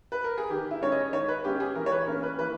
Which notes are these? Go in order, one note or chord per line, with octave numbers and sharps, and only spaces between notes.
B4
A#4
G#4
D#3 G4
E4
G#3 C#4 C#5
D#5
D#3 C#5
B4
G#3 C#4 G4
G4
G#4
E3 A#4
C#5
B4
A#3 C#4 A#4
B4
E3 B4